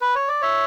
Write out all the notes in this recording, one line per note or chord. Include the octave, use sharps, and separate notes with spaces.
B4
C#5
D5
C#5 E5